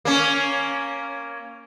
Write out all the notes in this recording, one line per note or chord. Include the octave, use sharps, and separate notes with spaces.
A#3 C#4